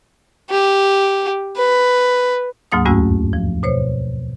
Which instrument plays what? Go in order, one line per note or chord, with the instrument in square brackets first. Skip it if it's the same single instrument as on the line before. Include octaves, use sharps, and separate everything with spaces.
[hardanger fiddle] G4
B4
[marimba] D2 G#2 F#3 A#3 F#5 D#6
E2 G2 A3 C#4 F#4 E6
F3
B2 C5 C#5